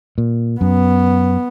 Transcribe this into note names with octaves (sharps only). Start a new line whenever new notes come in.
A#2
F#2 B3